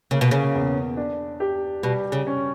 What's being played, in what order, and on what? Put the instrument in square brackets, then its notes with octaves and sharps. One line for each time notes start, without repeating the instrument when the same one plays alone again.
[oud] C#3 [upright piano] A#3
[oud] B2
C#3
[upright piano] E2
D4
G4
[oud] B2 [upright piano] G3
[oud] C#3
[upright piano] C#4